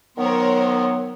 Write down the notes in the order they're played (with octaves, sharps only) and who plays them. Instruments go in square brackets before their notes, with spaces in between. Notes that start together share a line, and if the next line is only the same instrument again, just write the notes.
[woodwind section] D#3 F#3 B3 [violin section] A#4 C5 C#5